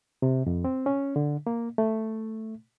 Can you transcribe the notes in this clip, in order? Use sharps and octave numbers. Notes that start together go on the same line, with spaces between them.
C3
F2
C4
C#4
D3
A#3
A3